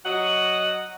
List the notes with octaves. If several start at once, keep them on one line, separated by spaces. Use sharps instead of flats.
F#3 F#4 D#5 F#5